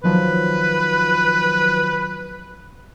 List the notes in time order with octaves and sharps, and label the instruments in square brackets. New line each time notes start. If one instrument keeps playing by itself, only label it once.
[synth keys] D#3 F3 F#3 [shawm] B4